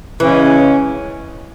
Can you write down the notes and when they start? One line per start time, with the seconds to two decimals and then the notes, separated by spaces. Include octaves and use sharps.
0.20 C#3 E3 G#3 C#4